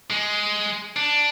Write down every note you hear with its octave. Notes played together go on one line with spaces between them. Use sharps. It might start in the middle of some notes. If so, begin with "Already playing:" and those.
G#3
D4